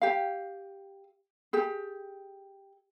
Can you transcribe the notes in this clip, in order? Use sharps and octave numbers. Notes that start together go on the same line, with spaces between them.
G4 F5
G4 G#4